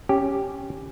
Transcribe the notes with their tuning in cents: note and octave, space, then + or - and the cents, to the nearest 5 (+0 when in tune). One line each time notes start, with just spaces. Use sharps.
C#4 +0 G4 +0